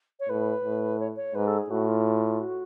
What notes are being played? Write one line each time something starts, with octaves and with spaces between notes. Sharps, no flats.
C#5
A2 B4
A2
C#5
C#5
G#2 B4
A4
G#4
A2 F#4
F4
F#4